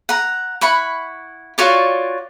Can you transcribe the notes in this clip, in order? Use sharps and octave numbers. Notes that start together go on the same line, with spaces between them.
F#5 A#5
E4 F#5 B5 C#6
F4 F#4 C#5 D5